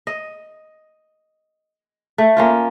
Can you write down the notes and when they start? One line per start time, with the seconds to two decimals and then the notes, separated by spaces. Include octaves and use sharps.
0.07 D#5
2.18 A3
2.37 A#3 C#4 F4